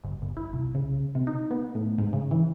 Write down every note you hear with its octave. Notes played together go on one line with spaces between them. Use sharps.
G1
G1
E4
C2
C#3
C3
D#4
B3
A2
G#2
C#3
E3